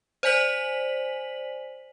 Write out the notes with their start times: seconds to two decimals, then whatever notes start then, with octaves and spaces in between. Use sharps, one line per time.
0.23 C5 D5 G#5 B6 F#7